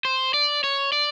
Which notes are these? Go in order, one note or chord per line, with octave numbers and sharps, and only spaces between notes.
C5
D5
C#5
D5